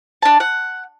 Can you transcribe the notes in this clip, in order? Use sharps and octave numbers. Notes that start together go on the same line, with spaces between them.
D4 A5
F#5